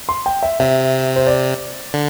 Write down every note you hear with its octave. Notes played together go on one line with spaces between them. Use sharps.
C6
G5
E5
C3 E5
C5
D5
D3